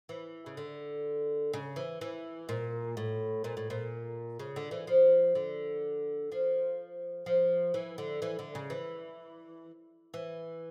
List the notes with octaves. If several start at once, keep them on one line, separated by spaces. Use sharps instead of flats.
E3
C#3
D3
C#3
E3
E3
A#2
A2
A#2
A2
A#2
C#3
D3
E3
F3
D3
F3
F3
E3
D3
E3
D3
C#3
E3
E3